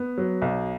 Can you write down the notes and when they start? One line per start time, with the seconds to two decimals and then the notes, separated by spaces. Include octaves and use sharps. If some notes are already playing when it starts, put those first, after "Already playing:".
Already playing: B3
0.18 F#3
0.42 B1